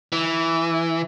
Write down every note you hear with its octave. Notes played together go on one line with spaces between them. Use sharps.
E3